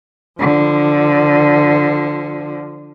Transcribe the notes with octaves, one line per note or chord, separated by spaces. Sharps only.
D3 F3